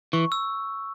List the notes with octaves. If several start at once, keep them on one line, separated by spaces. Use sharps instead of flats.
E3 C#6
E6